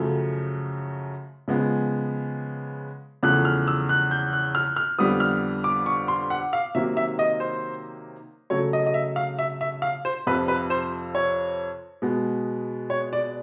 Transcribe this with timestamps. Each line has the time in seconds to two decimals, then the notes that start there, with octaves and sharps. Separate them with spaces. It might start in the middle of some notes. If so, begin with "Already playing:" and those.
Already playing: F#2 C#3 F3 A3
1.48 C#3 F3 G#3 B3
3.23 E2 C#3 F3 A3 F#6
3.45 F6
3.68 E6
3.89 F#6
4.11 G6
4.33 F#6
4.55 F6
4.76 F6
4.99 F2 D3 G3 B3 D#6
5.20 F6
5.64 D6
5.86 C#6
6.08 C6
6.30 F#5
6.53 F5
6.75 C3 D#3 F#3 A#3 E5
6.97 E5
7.19 D#5
7.40 C5
8.50 C#3 F#3 A3 C#5
8.73 D#5
8.86 D#5
8.94 E5
9.16 F5
9.39 E5
9.61 E5
9.82 F5
10.05 C5
10.27 F2 C3 F3 B4
10.48 B4
10.70 C5
11.15 C#5
12.02 B2 G#3 B3
12.90 C#5
13.13 D5